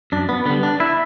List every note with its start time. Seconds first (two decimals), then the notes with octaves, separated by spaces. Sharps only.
0.12 F#2 D4
0.29 B3
0.46 D3 G3 B3
0.63 D4
0.80 E4